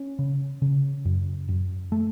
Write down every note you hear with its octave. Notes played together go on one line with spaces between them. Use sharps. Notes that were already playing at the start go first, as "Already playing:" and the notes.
Already playing: C#4
C#3
C#3
F#2
F#2
A3